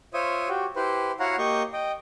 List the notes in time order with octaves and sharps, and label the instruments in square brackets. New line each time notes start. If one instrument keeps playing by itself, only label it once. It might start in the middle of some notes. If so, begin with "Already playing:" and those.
[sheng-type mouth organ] F4 C5 C#5 E5 D#6
F#4 G4
E4 G4 B4 C5
E4 F#4 C#5 F5 F#5 A#5
A#3 G4 D#5 C#6 G6
D#5 G5